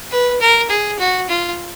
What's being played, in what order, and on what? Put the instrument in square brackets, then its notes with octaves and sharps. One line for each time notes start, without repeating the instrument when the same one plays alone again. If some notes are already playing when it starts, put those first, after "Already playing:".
[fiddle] B4
A#4
G#4
F#4
F4